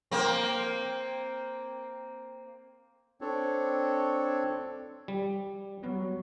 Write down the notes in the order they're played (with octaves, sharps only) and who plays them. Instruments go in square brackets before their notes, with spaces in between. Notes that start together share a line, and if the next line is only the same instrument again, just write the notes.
[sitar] A#3 C4
[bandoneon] C4 D4 A4 C#5
[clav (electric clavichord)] G3
[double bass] F#3 [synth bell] G3 B3 F#4